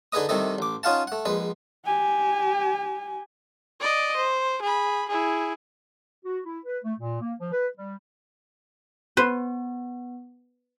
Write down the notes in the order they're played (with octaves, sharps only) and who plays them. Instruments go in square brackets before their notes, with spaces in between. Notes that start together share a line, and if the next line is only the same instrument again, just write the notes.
[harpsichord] D3 D#4 G#4 B4 D#5 D#6
C2 C3 D#3 A3 A4 D#5
A1 D6
C#4 D#4 F4 F5 F#5 A5
A3 F#5
A#1 G#3 B4
[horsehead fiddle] G4 G#5
[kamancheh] D5 D#5
C5
G#4 B5
E4 G#4
[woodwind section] F#4
E4
B4
A3
A#2
A#3
F3
B4
G3
[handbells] B3 [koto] B4 C5